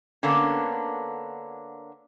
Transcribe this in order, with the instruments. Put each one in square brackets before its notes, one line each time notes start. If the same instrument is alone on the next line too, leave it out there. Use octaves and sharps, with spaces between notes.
[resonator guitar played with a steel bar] D3 A#3 B3 C#4 D4